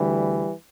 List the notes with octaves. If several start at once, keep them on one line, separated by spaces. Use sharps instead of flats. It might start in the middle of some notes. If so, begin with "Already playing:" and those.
Already playing: D2 D3 E3 G3